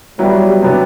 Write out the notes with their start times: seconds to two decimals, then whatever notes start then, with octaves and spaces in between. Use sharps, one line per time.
0.19 F#3 G3 B3 E4 B4
0.62 C3 F#3 B3 D4